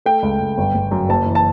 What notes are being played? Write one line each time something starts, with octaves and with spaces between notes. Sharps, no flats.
A3 G5
C#2
C#2
G1
G1
F#2
F#1 A5
E3
A5